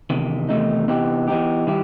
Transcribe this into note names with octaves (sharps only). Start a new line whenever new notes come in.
E2 C3 D#3
E2 C3 D#3 A3 D#4
C3 E3 B3 D#4 G4
E3 B3 D#4 G4
D#3 G3 E4 G4